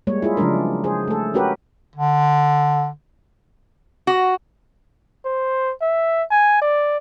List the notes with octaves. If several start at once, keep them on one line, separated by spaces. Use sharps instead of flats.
G3 G#3 A#3 C#5
E4 F4 G#4
C#3 F3 F#3 G#3 D4 A#4
G#4 C5
A3 A4
C#4 F#4 G4 A#4 B4
D3
F#4
C5
E5
G#5
D5